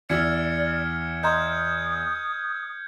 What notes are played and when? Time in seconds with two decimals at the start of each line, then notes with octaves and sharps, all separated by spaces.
0.10 E2 E4 D5 F6 G#6 C#7
1.23 D#5 A#5 C6 D#6 G6 G#6